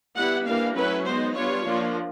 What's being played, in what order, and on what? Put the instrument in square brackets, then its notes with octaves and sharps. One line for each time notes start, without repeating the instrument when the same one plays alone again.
[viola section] G3 B3 E4 F#5
E3 G3 A#3 D4 F5
F#3 A3 C#4 E4 B4
G#3 B3 D#4 C5
G3 B3 D4 F4 C#5
F3 A#3 D4 F4